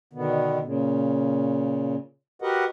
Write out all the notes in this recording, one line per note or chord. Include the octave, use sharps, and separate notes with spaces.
B2 D3 D#3 B3
A#2 C#3
F#4 G4 A#4 B4 D#5 F#5